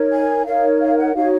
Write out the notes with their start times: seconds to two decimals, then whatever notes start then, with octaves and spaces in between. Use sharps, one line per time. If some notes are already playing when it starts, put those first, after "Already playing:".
Already playing: D#4 A#4 C#5
0.13 G#5
0.46 D#4 A#4 C#5 F5
0.80 F5
0.98 F#5
1.14 D#4 F#4 C#5 F5